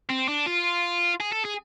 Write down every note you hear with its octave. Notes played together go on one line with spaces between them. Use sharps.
C4
D4
F4
G#4
A4
G#4